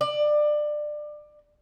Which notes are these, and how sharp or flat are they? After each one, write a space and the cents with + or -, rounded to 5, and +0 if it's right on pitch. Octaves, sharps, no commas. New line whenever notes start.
D5 +25